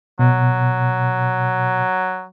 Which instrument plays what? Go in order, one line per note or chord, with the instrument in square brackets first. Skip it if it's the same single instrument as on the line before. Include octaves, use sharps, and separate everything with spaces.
[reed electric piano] B2 [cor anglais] F#3